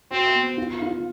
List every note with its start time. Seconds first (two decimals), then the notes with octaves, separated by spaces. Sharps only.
0.11 C4 F#4
0.35 B3
0.57 F4
0.82 F4